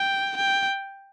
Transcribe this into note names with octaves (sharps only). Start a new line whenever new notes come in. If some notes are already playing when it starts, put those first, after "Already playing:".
Already playing: G5
G5